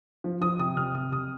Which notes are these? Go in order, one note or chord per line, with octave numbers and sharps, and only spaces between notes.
F3
F3 D#6
C3 D#6
C3 F6
C3 D#6
C3 D#6